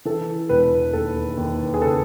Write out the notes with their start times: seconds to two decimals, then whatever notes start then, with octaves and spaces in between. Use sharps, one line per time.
0.05 E3 A4
0.49 E1 B4
0.93 D#2 A4
1.37 D#2
1.74 G#4
1.82 C#3 A4